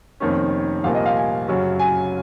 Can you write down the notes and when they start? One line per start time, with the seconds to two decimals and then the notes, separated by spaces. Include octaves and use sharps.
0.20 F1 F2 D#3 A#3 C#4
0.84 C2 A#2 F3 A#3 F5
0.95 D#5
1.06 F5
1.16 G#5
1.48 F#2 C#3 F#3 C#4
1.79 G#5